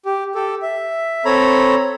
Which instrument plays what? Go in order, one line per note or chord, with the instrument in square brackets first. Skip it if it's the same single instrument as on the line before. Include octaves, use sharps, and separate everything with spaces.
[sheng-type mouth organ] G4
G4 A4
E5
C4 A4 C#5 A#5 B5